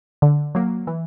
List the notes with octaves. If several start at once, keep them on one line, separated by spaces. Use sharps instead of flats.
D3
F#3 A#3
E3